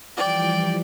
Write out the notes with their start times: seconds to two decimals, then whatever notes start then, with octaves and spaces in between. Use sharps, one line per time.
0.16 E3 F3 G3 D5 G5